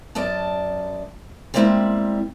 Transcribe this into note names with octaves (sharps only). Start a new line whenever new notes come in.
F#2 D5 D#5 A5
G3 G#3 A#3 C4 E4